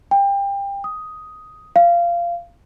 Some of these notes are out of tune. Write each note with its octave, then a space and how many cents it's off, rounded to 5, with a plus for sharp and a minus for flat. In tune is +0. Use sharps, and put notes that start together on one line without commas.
G5 +25
D#6 +5
F5 -20